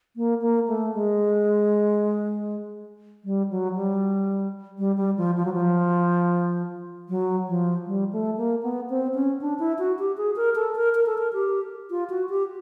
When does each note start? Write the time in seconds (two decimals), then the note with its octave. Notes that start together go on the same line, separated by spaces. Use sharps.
0.16 A#3
0.42 A#3
0.68 A3
0.94 G#3
3.25 G3
3.50 F#3
3.76 G3
4.78 G3
4.97 G3
5.17 F3
5.36 F3
5.45 F#3
5.53 F3
7.09 F#3
7.47 F3
7.86 G3
8.13 A3
8.37 A#3
8.63 B3
8.90 C4
9.14 C#4
9.41 D4
9.59 E4
9.79 F#4
9.99 G4
10.17 G#4
10.36 A#4
10.55 A4
10.75 A#4
10.95 A#4
11.06 A4
11.18 A#4
11.33 G4
11.90 F4
12.10 F#4
12.29 G4